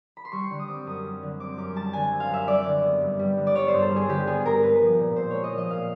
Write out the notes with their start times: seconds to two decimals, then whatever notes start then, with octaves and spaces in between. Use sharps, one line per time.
0.17 B5
0.25 C6
0.32 G3 C#6
0.50 D3
0.59 D#6
0.68 C4 D6
0.86 F#2 D#6
1.04 G3
1.23 D3
1.40 C4 D6
1.57 F#2 D6
1.76 G3 A5
1.93 D3 G#5
2.12 C4
2.20 F5
2.30 F#2 E5
2.47 G3 D5
2.66 D3
2.84 B3
3.01 G2
3.19 G3
3.37 D3
3.47 D5
3.55 B3 C#5
3.68 C5
3.74 G2
3.82 A4
3.91 G3
3.96 G#4
4.08 D3 G4
4.27 B3 G#4
4.45 G2 A#4
4.63 G#3 B4
4.81 F3
4.99 A#2
5.16 A#2 C5
5.30 G#3 C#5
5.44 D#5
5.52 F3
5.58 D#5
5.70 A#2 F5